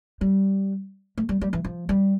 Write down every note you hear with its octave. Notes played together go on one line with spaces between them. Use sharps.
G3
A3
G3
G3
E3
F3
G3